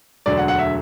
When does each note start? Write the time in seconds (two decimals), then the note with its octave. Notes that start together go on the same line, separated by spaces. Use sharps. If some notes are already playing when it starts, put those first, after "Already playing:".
0.26 E1 D2 D3 F#3 D5
0.37 F#5
0.48 F#5
0.58 E5